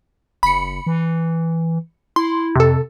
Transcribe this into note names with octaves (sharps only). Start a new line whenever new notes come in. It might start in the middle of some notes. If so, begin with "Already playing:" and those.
F#1 B5 C#7
E3
E4 C6
F2 C3 A4